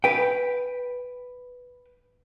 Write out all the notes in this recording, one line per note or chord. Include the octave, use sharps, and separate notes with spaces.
B4 G5